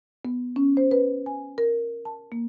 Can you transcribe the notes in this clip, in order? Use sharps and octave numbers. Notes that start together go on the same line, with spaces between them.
B3
C#4
C5
B4
G#5
A#4
A5
A#3